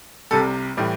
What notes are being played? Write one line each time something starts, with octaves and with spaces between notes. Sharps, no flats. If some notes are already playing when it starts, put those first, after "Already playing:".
C2 C3 G3 A4
A2 E3 G3